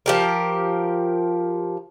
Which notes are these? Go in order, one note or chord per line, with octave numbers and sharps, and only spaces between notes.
F3 G4 A#4